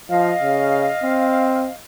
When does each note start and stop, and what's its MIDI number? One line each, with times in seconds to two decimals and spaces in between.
0.10 0.32 53
0.10 1.76 75
0.10 1.76 77
0.42 0.89 49
1.03 1.68 60